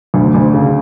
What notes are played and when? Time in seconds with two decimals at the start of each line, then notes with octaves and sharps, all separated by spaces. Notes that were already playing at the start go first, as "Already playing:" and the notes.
0.14 D2
0.34 D2
0.54 C#3